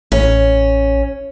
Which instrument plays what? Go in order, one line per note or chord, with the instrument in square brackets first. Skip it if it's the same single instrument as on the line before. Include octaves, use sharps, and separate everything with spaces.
[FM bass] A1 [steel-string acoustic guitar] C#4